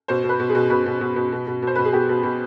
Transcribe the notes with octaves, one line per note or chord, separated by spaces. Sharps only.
B2 C5
B2
B4
B2
G#4
B2
B2 B4
B2
B2
B2
B2
B2
B2 C5
B2 B4
G#4
B2 G4
B2
B2